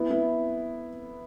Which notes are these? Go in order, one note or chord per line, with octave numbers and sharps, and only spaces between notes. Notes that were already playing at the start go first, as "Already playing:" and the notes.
Already playing: B3 E4
B3 E4